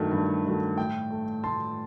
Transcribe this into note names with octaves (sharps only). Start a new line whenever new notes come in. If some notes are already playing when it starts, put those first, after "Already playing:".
Already playing: G2 D#3 F#3 A3
G2
D#3 F#3 A3
A2 G5
A3
A2 A5 C6